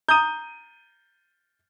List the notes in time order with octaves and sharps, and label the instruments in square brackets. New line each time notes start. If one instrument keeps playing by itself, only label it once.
[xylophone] A#5 D#6 [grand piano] G6 D#7